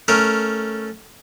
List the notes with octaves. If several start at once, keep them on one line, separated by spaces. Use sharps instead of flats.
A3 C#4 A#4